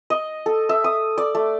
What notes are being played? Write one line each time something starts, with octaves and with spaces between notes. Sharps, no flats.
D#5
A4
E5
D#6
D5
A3